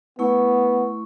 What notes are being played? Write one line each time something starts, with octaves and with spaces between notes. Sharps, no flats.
A3 B3 E4 C#6